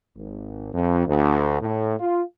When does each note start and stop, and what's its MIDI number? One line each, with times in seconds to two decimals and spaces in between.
0.16 0.73 32
0.73 1.04 41
1.06 1.59 38
1.61 1.95 45
2.00 2.21 65